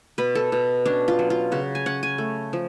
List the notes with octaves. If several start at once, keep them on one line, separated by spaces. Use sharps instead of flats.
B2 B4
A4
B2
C#4 D4
F4
F#3
F4
C#3 F#4
G#5
C#4 F#5
G#5
A3
F3